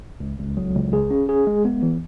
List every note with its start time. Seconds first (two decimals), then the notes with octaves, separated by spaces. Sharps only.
0.20 C#2
0.39 C#2
0.57 F#3
0.75 C#2
0.93 G#4
1.11 C#4
1.29 G#4
1.47 G#3
1.65 B3
1.83 E3